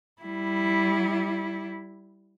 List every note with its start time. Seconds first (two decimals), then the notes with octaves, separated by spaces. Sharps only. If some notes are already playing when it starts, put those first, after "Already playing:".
0.22 G3 E4